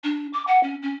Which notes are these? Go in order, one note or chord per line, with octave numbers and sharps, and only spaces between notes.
D4
D6
F#5
C#4
C#4